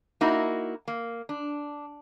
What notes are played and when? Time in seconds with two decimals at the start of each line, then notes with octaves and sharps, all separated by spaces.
0.21 A#3 D#4 E4 F#4
0.88 A#3
1.29 D4